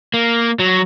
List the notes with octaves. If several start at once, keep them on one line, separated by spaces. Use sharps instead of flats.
A#3
F#3